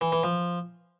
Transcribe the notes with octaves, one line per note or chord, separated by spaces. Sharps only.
E3
E3
F3